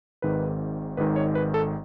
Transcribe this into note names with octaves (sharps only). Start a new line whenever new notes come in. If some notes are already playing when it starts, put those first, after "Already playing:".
G#1 G#2 D#3 B4
G#1 G#2 D#3 B4
C#5
B4
A4